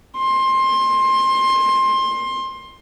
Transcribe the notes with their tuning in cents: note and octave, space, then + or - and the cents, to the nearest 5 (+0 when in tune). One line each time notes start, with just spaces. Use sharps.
C6 +20